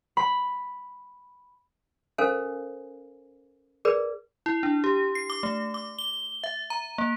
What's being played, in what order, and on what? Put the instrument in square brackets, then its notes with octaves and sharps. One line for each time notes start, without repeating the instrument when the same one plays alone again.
[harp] B5
[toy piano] C#4 A4 A#4 C5 F5 G#5
G#4 A#4 B4 D5
[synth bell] E4
D4
G4
C7
D6
A3
D6
G7
E5
A#5
A#3